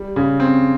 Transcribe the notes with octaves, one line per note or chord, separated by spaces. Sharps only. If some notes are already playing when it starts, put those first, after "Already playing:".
Already playing: G3
C#3
C4